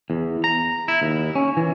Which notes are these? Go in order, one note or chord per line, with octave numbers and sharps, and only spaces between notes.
E2
A#5
E4
D#2
C#4
E3